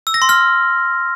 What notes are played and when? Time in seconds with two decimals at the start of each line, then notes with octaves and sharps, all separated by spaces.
0.07 E6
0.14 A#6
0.22 C6
0.29 F6